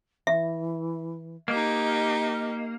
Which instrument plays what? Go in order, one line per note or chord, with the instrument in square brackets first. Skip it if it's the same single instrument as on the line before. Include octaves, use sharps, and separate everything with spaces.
[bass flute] E3 [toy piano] E5
[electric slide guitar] A#3 [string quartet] D#4 G4 [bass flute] D#5